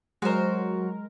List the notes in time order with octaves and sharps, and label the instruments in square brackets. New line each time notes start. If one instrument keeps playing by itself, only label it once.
[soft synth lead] F#3 [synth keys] G#3 A#4 [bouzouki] F#4 C5